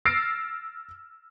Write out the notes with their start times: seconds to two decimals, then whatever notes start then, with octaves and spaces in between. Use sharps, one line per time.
0.05 E6 F6 A6 A#6 C7 D7